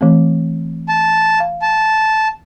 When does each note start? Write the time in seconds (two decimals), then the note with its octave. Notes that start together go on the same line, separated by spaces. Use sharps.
0.01 E3 A3 C4
0.89 A5
1.40 F5
1.62 A5